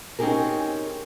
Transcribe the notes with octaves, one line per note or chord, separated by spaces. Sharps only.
C4 C#4 D#4 G4 G#4 A#4